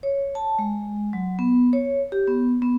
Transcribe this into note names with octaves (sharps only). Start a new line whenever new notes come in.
C#5
A5
G#3
F#3
B3
C#5
G4
B3
B3